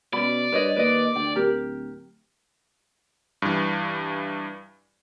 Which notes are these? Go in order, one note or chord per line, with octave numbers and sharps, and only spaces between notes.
B2 C#4 D5 B5
G2 B4 C#5 D#5
D#2 B4 D#5
D2 G5
D1 G4 A#4
G2 E3